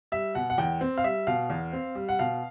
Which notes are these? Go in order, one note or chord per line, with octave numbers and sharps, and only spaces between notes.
G3 E5
B2 F#5
F#5
E2 G5
C4
F5
G3 E5
B2 F5
E2
C4
G3
F#5
B2 F5